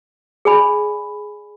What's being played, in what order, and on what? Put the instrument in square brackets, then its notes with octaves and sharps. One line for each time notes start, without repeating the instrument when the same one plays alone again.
[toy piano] G#4 D5 G#5 B5